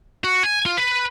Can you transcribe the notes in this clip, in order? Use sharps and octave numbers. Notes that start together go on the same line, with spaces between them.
F#4
G#5
F4
B4